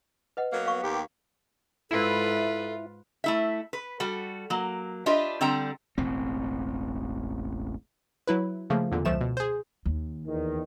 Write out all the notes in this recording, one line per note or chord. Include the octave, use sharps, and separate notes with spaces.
B4 D#5 F#5
F#3 A#3 B3
F5 C#6
D#2 B3 G4
G#2 E4 F4 A4 B4
A3 E4 E5
B4
G3 F#4 A4
F#3 A#3
D4 F4 G4 B4 D#5 E5
D3 G3 C4 G5 A#5
E1 A1 C4
F#3 E4 B4
C#3 F3 A3 A#3
E2 A#2 D3
C#2 F3 A3 E7
B2
G#4 C5
D#2
E2 D#3